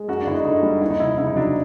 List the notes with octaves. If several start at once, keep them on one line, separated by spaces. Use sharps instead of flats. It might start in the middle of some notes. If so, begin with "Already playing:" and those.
Already playing: G#3
F#2 F#4
D4
G1 E4
D#4
D3 D#4
G3
D#2 E4
D#4
F1 E4
C#3 E4
D#4
F#3 D4